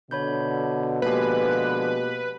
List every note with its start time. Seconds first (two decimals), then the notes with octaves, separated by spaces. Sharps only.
0.11 B2 D3 C#5 B5 G6
1.02 D3 F3 G#3 A#3 G4 B4